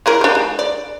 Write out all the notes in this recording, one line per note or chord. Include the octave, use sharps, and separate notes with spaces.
E4 G#4 A#4
D4 G4
G#3
D5